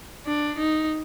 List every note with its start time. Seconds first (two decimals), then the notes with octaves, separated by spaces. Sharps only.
0.26 D4
0.58 D#4